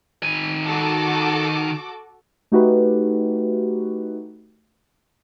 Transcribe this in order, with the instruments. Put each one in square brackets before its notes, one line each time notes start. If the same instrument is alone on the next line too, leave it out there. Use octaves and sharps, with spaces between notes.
[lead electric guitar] D#3 G#5
[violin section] F#4 A4 D6
[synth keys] A3 D#4 F#4 G4 B4